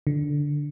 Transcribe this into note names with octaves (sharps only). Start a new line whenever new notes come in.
D3